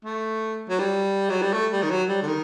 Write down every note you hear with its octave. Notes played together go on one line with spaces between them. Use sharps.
A3
F#3
G3
F#3
G3
A3
G3
D#3
F#3
G3
D3
D#3